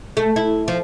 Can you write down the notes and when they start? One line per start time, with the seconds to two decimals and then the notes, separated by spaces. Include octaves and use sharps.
0.17 A3
0.36 E4
0.68 F3